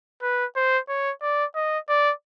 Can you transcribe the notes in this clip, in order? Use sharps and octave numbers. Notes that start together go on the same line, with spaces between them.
B4
C5
C#5
D5
D#5
D5